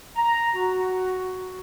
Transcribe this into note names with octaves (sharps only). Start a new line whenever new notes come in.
A#5
F#4